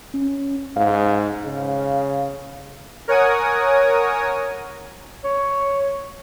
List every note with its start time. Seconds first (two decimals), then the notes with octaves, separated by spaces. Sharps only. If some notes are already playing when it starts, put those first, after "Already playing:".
0.14 C#4
0.76 G#2 F5
1.45 C#3
3.08 A#4 C#5 F#5 G#5 D#6
5.24 C#5